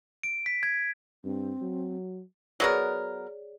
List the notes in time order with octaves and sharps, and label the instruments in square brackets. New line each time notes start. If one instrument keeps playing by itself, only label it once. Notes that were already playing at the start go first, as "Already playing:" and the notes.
[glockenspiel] D7
B6
G#6
[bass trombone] G2 [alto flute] C4
[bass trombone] F#3
[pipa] F#3 B3 A#4 [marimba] G#4 C#5 D5